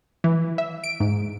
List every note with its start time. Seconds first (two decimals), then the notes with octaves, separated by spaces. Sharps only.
0.24 E3
0.58 E5
0.84 D7
1.00 G#2